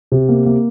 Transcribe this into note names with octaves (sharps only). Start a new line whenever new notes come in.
C3
A#3
A#3